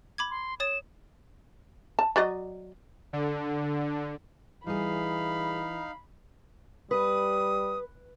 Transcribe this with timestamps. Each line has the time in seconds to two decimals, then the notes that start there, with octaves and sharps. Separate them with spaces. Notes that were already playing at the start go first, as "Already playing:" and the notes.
0.18 B5 D6 G#6
0.31 C6
0.60 C#5 D#6 A6 E7
1.99 A5
2.16 F#3 D5 D#5
3.13 D3
4.67 E3 G3 D#4 G#4 F5 B5
6.91 G3 B4 D#6